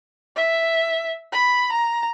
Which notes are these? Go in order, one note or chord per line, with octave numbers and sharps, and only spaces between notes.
E5
B5
A#5